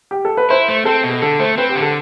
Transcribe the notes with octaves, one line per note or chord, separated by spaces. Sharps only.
G4
A4
B4
E4 C5
A3
C4 A4
B2
A4
D3 A4
A3 C5
C4 B4
G4
D3
A4